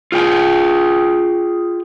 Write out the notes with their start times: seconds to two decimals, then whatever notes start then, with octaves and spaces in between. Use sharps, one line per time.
0.12 F4 G#4 G5